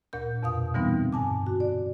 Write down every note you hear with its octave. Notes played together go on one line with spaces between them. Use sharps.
D2 A#2 A#4 G6
F2 B2 F5 D#6
D3 E3 G3 B3 C4 D#4
G2 G#5 A5 D6
F#4
D5